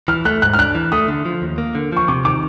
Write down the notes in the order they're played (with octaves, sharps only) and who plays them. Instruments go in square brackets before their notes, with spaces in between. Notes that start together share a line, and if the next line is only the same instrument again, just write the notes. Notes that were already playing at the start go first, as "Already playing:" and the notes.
[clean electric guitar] E3 [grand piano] F6
[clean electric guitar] A3 [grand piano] F#6
[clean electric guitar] G#2 [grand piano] F#6
[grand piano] F6
[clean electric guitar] D4 [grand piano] F#6
[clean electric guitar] E3
[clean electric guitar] A3 [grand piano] D#6
[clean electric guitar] D3
F3
D#2
A#3
D3
[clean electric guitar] F3 [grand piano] C#6
[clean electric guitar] C3 [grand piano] D6
[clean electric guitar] D#3 [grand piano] D6